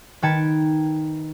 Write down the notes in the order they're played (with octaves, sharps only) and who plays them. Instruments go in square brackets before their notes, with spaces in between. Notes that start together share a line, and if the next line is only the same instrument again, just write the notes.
[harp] D#3 B4 G5 A5 G#6 C#7